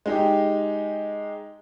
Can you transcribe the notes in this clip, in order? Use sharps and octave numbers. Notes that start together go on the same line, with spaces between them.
G#3 D#4 G4